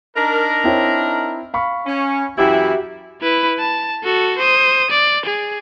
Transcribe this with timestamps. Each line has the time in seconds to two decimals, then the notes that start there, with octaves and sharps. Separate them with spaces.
0.16 D4 D#4 A#4
0.64 C4 E4 C#5
1.54 F5 B5 C#6
1.87 C#4
2.37 F#2 E3 E4 F#4 G4 E5
3.21 E4 B4
3.59 A5
4.04 F#4 A4
4.38 C5 D#6
4.91 D5
5.26 G#4